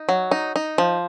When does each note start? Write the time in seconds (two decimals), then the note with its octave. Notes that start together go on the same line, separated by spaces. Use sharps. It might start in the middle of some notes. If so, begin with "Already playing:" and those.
Already playing: D#4
0.09 F#3
0.31 D#4
0.56 D#4
0.78 F3